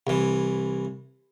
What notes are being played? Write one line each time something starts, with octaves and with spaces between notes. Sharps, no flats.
C2 E3